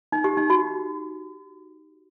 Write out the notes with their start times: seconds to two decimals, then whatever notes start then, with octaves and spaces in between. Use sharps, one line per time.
0.12 D#4
0.24 G4
0.37 D#4
0.50 F#4